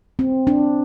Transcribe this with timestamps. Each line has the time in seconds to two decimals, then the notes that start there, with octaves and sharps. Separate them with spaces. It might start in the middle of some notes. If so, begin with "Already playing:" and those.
0.19 C4
0.47 D4